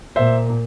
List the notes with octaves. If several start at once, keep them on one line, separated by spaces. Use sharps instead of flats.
A#2 C5 E5